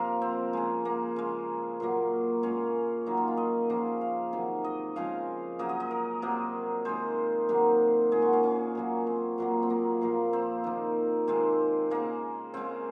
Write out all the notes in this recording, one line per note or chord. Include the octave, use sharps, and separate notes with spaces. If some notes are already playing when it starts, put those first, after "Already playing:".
Already playing: C3 F3 A#3 A#4
C4
C#3 G#3
A#3
C#3 G#3
A#2 F#3 A#3
A#2 G#3 C#4
D#3 F#3 A#3 D#4
F4
F4
D#5
C#3 F3 A#3
F5
C3 D#3 F#3
D#5
C#3 F3 G#3 F5
C#3 F#3 A#3 D#5
D#5
D#5
A#4
C3 F#3 A#3
D#3 G#3 C5
C3 D#3 F#3 A#3
A#2 G#3 G#4
F#4
C#4
C#4
A#2 F#3 A#3
C4
A#2 F#3 A#3
C4
A#3
A#2 F3 A#3
C4
D#3 A#3
C3 D#3 G#3 C4
C#3 G#3 A#3
C#3 G#3 C4